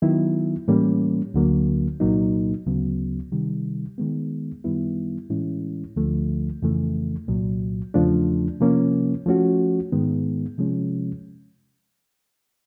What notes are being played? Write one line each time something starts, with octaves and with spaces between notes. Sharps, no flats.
D#3 F#3 B3 E4
A2 E3 G3 A#3 C#4
D2 D3 F#3 A#3
C2 A#2 F#3 A#3 D#4
D2 C#3 F#3 B3
C3 D#3 G3
D#3 G#3 B3
F#2 D#3 G3 B3 E4
A2 E3 G#3 C#4 E4
D2 D3 F3 A3
F2 C#3 E3 A3
C2 A#2 F#3
E2 C#3 F3 A3 D4
C3 F3 A#3 C#4
F3 A3 C#4 F#4
G#2 D#3 G#3 B3
C3 F3 G#3 C#4